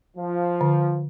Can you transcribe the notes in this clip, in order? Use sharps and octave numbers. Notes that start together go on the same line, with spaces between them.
F3
D3